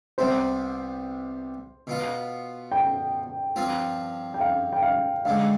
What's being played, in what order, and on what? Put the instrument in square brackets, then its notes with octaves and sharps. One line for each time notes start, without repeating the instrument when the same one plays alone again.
[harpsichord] C2 C3 G3 B3 [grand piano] C5
[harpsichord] B2 B3 F4
[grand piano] G5
[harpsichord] G2 F3 C4 F4
[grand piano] G5
F5
G5
F5
[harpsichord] G2 D3 G#3 [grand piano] F5